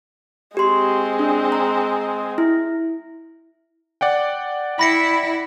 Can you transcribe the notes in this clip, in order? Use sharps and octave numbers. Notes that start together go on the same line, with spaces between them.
G#3 C4 G4 C6
D4
A#5
E4
D5 F#5 G5
E4 B5 A#6 C#7